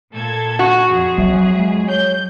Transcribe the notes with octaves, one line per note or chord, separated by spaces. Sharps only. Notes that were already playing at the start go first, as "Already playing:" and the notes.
A#2 A4 G#6
F#4
F2 G#4
F#3 E5
G#3
C#5 G6